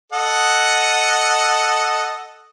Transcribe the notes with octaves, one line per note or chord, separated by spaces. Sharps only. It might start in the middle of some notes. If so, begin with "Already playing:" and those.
A4 D#5 F#5